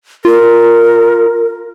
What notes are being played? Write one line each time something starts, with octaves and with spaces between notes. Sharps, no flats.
F4 A#4